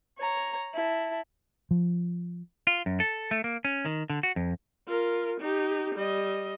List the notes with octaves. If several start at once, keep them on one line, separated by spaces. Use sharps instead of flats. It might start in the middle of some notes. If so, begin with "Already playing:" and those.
C#5 A#5
E4 A5
F3
F4
F#2
A4
A3
A#3
C#4
D#3
D3
F#4
F2
F4 A#4
D#4 G4
G3 D#5